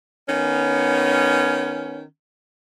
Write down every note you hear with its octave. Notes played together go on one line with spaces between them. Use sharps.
D#3 B3 C#4